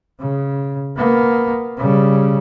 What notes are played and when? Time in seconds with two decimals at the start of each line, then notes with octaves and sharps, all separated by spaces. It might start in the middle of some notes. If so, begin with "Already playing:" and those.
0.20 C#3
0.97 A#3 B3
1.77 C#3 G3